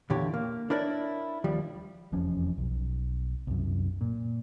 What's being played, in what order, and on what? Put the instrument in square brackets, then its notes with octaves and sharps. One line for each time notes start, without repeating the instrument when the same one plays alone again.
[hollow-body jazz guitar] E2 A#2 D3 E4 G4 C#5
A#3
D4 E4 A#4 C#5 D5
D#2 F3 G3
[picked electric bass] F1 E2 F3 C#4
B1
C2 F#2
A#2